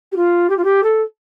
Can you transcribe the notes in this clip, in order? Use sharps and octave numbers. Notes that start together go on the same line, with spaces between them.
G4
F4
G4
F4
G4
A4